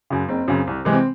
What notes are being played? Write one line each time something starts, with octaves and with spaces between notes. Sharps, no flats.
F#2 C#3
F#1 C4
F#2 C#3
C2
C3 E3 G#3
C4